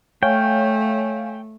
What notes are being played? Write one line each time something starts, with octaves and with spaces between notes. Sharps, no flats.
A3 C#5 F5 G5 G#5